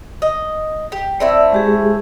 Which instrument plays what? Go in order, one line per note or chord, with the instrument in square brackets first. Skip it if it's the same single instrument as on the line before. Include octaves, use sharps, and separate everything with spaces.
[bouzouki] D#5
G4
[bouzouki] A3 C4 E4 [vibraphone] D5
[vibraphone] G#3 G4 G#4